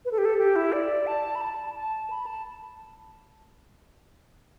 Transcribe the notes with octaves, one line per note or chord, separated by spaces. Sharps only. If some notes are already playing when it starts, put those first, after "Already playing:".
B4
A4
G4
A4
G4
E4
D5
A5
B5
A5
A5
B5
A5